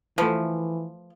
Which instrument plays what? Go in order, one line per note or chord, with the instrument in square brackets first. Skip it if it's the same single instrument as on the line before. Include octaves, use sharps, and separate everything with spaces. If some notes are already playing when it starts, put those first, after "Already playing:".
[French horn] E3 [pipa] F3 [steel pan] A3 B4